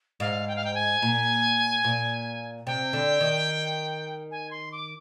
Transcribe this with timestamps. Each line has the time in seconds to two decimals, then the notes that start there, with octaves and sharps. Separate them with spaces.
0.20 G#2 F5
0.48 G5
0.56 F5
0.64 G5
0.75 G#5
1.02 A#2
1.84 A#2
2.66 C3 G5
2.93 D3
3.21 D#3
4.31 G#5
4.51 C6
4.72 D6